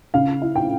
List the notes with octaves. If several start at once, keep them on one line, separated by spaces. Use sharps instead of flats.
C#3 F5
E4
G5